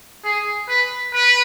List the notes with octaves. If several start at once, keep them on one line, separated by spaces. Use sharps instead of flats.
G#4
B4
B4